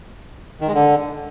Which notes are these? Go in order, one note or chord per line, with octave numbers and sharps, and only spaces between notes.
D#3
G#3
D3